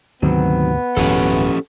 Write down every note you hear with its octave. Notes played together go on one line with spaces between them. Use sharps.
D2 G#2 C3 D#3 F#3 B3 C4
D#1 G#2 F3 C#4 G4 A4